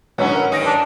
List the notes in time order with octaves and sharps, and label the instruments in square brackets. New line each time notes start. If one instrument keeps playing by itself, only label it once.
[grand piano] G#2 D3 F#3 [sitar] B3 C#4 E4
[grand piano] A#4 F#5
[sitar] G2 D#3 D#4 [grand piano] D#6 A#6 D7
[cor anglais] D4